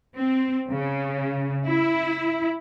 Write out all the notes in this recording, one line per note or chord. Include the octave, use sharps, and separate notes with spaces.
C4
C#3
E4